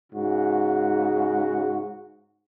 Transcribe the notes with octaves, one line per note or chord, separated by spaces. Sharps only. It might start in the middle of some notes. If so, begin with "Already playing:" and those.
G#2 C#3 F#4